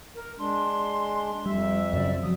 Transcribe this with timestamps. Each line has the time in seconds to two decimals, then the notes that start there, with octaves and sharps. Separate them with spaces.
0.15 A#4
0.39 G#3 D4 C6
1.46 F2 G3 E5
1.93 F#2 C#3 D5
2.23 F3 F#3 D#6